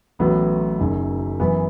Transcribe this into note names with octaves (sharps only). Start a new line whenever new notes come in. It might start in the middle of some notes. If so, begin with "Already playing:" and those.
A1 A2 F#3 B3
F#1 F#2 D#3
F#2 E3 B3